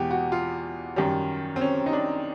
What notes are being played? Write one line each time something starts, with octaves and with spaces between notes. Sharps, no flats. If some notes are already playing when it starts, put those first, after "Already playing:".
Already playing: E2 B2 G#3 F#4 G4
F#4
F4
F#2 D#3 G3
C4
C#4
D#4
D4